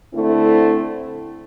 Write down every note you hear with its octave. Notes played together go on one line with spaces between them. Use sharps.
D3 A3 C4 E4